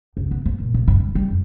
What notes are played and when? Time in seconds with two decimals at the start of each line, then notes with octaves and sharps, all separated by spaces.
0.17 C#2
0.31 B3
0.46 A#3
0.60 A#2
0.74 D2
0.88 G2
1.00 G2
1.15 G3
1.30 F2